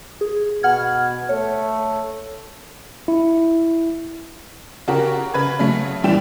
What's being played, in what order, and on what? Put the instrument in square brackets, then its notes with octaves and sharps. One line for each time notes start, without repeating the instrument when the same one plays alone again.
[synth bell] G#4
[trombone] B2 [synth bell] F#5 F6 G#6
[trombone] A3 [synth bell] C#5
[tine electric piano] E4
[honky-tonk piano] C#3 F#4 G4 A#4
C#3 B4 B5 G#6
C#3 F#3 A3
A#1 E3 G3 G5 E7